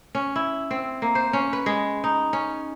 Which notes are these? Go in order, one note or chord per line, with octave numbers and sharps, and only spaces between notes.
C#4
E4
C4
A#3
C5
C#4
B4
G#3
D#4
C#4